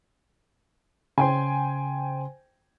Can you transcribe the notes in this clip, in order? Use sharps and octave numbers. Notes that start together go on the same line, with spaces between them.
C#3 C5 G5 G#5 C6